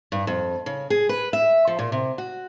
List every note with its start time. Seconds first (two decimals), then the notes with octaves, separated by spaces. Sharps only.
0.12 G2
0.27 F2
0.66 C#3
0.90 G#4
1.09 B4
1.33 E5
1.67 F3
1.79 A#2
1.92 C3
2.18 F#4